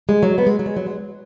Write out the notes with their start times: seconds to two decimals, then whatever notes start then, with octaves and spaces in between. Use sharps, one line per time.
0.09 G#3
0.23 F#3
0.38 B3
0.47 G#3
0.59 F#3
0.66 G#3
0.76 F#3
0.86 G#3